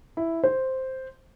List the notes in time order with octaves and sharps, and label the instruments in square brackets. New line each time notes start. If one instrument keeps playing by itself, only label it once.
[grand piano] E4
C5